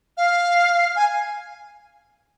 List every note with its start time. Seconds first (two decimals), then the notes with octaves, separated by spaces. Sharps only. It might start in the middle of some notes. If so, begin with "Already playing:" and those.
0.17 F5
0.96 G#5